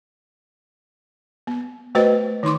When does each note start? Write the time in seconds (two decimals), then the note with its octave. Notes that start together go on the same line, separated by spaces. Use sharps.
1.47 B3
1.95 A3 F#4 B4 C5 D#5
2.43 D#3 D#4 C6 D6